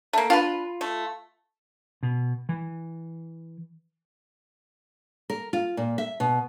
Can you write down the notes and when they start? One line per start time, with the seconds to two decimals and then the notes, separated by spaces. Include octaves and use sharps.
0.13 A3 A#3
0.30 D4 F4 B4
0.81 A3
2.03 B2
2.49 E3
5.30 A#4
5.53 F4
5.77 A#2
5.98 E5
6.20 B2